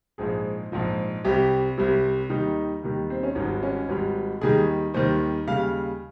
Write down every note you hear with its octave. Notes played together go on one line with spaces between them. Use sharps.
A#1 G#2 F3 G#4
A#1 G#2 F3
C2 C3 G3 G4
C2 C3 G3
D#2 D#3 G3 D#4
D#2 D#3 G3
C4
C#4
G#1 G#2 G3 D#4
C#4
G#1 G#2 G3
D#2 D#3 G3 G#4
D#2 D#3 G3 C5
D#2 C#3 G3 F5